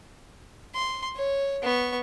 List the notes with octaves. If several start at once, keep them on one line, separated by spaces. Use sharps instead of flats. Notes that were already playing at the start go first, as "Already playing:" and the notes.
C6
C#5
B3 C#6